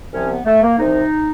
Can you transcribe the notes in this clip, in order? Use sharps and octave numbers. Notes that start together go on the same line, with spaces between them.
C2 C3 F3 C#4
B3
A3
A#3
C2 C3 F3 D#4